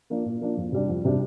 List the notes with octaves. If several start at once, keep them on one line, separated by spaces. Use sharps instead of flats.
F3 A#3 D4
A#2
F3 A#3 D4
F2
C3 G3 D4
F2
C3 G3 D4